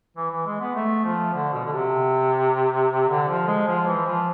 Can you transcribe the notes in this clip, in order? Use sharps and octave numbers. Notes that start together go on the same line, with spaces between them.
E3
E3
G#3
B3
A3
F3
D3
B2
D3
C3
D3
F3
G#3
F3
E3
F3